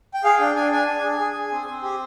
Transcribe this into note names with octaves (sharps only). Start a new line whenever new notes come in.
G5
G#4 F5
D4 G5
D4 G#5
D4 G#5
D4
G#4
G#4
G#4
C4
C4
G4